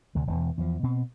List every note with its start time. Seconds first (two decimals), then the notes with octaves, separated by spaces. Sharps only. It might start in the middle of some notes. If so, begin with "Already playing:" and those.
0.15 D2 C3
0.27 E1 E2 E3
0.58 E2 F3
0.83 B2 C4